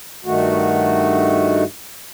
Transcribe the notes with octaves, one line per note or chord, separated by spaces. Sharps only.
G2 D#3 A3 F#4